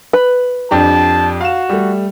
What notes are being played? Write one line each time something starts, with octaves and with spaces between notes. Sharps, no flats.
B4
F2 D4 G4 A5
F#4 F5 E7
G3 A3